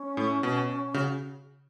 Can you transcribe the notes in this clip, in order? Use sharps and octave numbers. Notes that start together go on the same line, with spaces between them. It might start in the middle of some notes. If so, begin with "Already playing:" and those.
Already playing: C#4
A2
B2
C#3 F#4